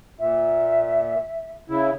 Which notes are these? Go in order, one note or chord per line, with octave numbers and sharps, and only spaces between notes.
A#2 E5
C#3 E4